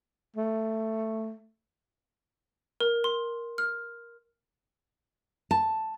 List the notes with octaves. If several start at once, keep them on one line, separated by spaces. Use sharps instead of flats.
A3
A#4
C6
F6
A5